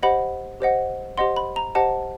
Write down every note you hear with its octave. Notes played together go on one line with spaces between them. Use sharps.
G4 C5 D#5 F#5 B5
G4 C5 D#5 F#5
G4 C5 D#5 F#5 C6
B5
A#5
G4 C5 D#5 F#5 A5